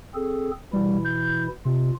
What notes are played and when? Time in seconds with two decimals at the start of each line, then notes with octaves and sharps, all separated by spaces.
0.14 C4 G#4 A4
0.73 B2 E3 G3 E4
1.05 G6
1.65 C3 F4